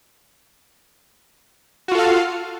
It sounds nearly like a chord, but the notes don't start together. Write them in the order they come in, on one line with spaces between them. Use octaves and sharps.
F#4 F4 A4 F5